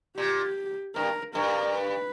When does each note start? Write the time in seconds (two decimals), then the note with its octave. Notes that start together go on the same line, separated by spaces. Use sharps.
0.17 A#2 G4
0.96 G2 A#4
1.35 G2 A#4
1.75 B4